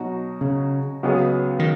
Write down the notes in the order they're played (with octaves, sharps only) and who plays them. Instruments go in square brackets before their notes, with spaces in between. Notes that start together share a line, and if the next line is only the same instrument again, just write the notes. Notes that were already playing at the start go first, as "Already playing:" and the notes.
Already playing: [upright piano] B2 F#3 D#4 F#4
[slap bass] C#3
[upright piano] C#2 C#3 F#3 B3 G#4
[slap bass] D#3